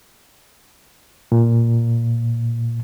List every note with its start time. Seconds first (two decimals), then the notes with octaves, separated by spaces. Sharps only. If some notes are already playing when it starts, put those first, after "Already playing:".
1.32 A#2